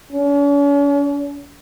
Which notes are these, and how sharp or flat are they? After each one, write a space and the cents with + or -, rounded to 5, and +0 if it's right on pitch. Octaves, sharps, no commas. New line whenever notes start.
C#4 +45